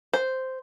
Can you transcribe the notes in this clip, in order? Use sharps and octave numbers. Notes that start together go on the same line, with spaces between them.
C5